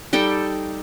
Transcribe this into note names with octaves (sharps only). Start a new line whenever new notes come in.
G3 D#4 A4 G5